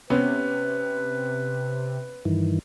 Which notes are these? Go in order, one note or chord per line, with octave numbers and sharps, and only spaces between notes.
C3 B3 C#4 B4
G2 D#3 E3